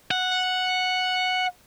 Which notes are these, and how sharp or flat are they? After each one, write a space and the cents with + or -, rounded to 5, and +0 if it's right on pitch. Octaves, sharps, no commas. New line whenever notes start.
F#5 -5